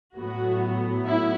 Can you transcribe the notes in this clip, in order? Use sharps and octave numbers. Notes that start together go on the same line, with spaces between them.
A2 F#3 B3 F#4
E4